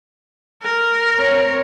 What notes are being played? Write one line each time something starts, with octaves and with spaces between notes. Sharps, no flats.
A#4
C4 C#5